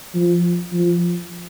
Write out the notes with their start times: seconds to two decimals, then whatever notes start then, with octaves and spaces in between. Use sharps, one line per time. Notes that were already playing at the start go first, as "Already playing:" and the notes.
0.15 F3
0.73 F3